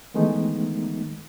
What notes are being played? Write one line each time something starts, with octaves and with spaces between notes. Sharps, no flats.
D#3 E3 G#3 A3 B3 D#4